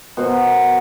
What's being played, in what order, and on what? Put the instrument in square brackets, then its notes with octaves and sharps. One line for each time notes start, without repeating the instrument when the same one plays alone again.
[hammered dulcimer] B2 A#4 C5 F#5